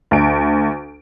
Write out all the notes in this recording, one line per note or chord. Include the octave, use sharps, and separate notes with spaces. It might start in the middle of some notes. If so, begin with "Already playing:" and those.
D2 D7